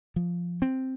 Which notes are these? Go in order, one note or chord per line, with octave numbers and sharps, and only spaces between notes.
F3
C4